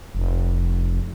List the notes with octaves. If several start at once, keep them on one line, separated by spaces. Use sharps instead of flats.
F1